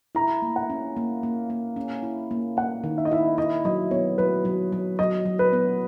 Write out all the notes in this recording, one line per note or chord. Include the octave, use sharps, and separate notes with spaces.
E4 A#5
A#3
F#5
C#4
A#3
A#3
A#3
C#4
E4
A#3
A#3 F#5
D#3
E5
D#5
E4 E5
E4 D#5
F#3 D#5
B3 C#5
F#3 B4
F#3
F#3
F#3 D#5
F#3
B4
B3